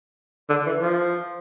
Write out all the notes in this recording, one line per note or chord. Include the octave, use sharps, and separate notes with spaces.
D3
E3
F3